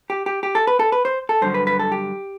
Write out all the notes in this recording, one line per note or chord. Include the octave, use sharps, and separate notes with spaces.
G4
G4
G4
A4
B4
A4
B4
C5
A4
G2 D3 F#3 C5
B4
B4
A4
G4